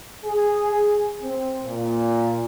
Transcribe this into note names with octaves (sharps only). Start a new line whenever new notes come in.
G#4
C4
A#2